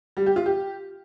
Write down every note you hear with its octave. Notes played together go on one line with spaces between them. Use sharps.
G3
G4
F4
G4